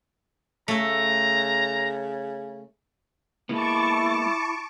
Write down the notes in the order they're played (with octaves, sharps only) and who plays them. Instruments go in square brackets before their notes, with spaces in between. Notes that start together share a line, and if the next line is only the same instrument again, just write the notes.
[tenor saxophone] C#3 [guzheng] A3 A4 [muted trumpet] A#5
[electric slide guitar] G#3 A#3 B3 [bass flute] E4 [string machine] A5 C#6 D6